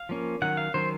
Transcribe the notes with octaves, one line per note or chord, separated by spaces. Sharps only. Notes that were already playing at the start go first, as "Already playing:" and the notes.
Already playing: F5
F3 A#3 C#4
D#3 F#3 C#4 F#5
F5
D#3 F#3 C#4 C5